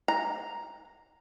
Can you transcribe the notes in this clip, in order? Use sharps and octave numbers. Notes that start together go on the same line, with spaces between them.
A#5